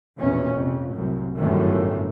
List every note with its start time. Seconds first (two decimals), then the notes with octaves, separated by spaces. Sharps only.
0.17 A#1 E2 B2 C#4
0.56 F2 C3
0.92 C2 F#2 A2
1.36 G1 F#2 A2 D3 D#3 A3